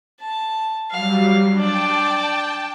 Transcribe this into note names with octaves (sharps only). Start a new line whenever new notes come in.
A5
F#3 G3 F5
D4 D5 G5 A5